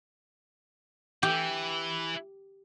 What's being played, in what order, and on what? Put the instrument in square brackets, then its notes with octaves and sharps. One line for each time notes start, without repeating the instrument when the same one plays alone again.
[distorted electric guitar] E3 [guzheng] G4